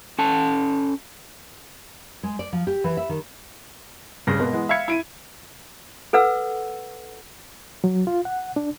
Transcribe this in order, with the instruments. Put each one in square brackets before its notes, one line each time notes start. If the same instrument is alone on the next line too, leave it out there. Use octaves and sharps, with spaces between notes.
[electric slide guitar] C#4 A4 A5
[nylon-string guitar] G#3
D5
F3
G4
E3
E5
D#3
[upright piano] D#1 G2 C#3 A#6
B2 G#3 A#3 B3
E3 G#3 B3
E5 F5 B5 G#6 C#7
E4 D7 D#7
[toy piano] A4 B4 F#5 E6
[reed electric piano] F#3
F4
F#5
D4